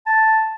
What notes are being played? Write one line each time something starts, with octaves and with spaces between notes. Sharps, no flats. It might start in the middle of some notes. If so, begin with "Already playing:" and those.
A5